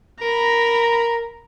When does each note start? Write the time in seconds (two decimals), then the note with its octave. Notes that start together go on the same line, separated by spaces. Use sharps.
0.22 A#4 A#5 B5